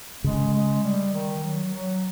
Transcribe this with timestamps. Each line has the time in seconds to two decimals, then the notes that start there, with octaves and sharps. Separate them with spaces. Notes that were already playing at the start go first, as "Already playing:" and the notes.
0.24 C#3 G#3
0.54 G#3
0.84 G3
1.14 D#3
1.43 F#3
1.73 F#3